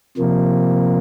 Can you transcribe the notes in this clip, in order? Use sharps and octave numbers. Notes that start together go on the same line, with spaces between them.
C3 F3 A#3